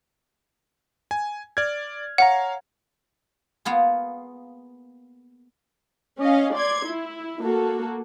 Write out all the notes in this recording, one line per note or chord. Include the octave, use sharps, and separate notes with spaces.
G#5
D5 F6 G#6
C#5 F5 F#5 A#5
A#3 B3 F4 G#4
C#4 D#5 F5
D5 C6 G#6
E4
A#3 F#4 A4